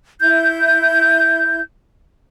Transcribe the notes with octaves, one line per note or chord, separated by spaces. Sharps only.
E4 G6